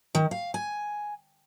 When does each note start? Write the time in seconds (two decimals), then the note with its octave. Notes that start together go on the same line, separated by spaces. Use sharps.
0.15 D#3
0.31 F5
0.54 G#5